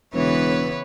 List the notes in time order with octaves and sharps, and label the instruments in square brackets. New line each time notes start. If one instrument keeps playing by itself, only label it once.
[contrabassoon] E1 [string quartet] C#3 E3 B3 [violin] B4 C#5